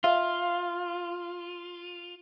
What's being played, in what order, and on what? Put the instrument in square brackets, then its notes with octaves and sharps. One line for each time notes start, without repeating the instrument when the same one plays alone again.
[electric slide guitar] F4 [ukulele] E5 F5